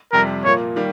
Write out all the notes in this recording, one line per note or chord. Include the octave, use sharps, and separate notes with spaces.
F2 C3 G3 A#4
A#2 F3 A#3 C#5
D#3 G3 A#3